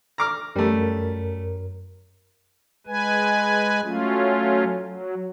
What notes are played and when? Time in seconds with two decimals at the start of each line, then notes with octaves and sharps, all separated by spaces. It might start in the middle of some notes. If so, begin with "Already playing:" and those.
0.18 A#5 D6 F6
0.56 F#2 G3 A3 A#4
2.87 G#3 B4 G#5
3.84 F#3 A3 C#4 F4
4.82 F#3